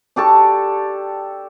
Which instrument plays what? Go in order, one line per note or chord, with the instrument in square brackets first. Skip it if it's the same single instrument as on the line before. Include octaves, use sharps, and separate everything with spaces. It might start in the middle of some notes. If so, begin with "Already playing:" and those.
[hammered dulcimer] D4 G4 A4 C#6